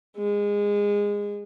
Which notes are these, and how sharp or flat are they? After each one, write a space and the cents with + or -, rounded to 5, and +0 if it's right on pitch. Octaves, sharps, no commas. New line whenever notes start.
G#3 -20